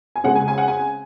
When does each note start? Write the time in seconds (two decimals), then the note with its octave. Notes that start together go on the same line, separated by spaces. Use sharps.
0.16 G#5
0.24 C#3 G#3 C4 F#5
0.35 G#5
0.48 G#5
0.58 F#5
0.68 G#5